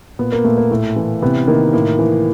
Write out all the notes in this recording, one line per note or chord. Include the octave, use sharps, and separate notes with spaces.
A#2 B3
A#3
A#2 A3
A#3
A2 A3
E3
C3 B3
D#3 A#3
A2 A#3
E3